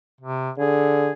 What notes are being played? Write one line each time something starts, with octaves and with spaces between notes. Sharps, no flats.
C3
D3 G#4